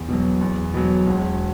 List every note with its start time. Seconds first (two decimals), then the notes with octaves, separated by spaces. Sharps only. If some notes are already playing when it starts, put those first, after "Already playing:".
Already playing: E2
0.09 B2 F#3
0.41 E2
0.74 B2 F#3
1.06 E1